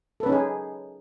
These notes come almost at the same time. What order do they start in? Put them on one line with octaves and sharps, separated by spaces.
A4 B4 C#4 D#4 G#4